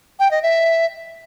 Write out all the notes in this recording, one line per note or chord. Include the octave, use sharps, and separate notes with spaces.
G5
D#5
E5